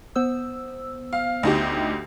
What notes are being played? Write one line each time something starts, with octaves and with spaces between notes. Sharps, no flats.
B3 C5 E6
F5
D2 D#4 G4